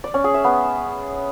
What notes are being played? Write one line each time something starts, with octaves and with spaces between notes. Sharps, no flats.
D5
C#4
G#4
E5
B3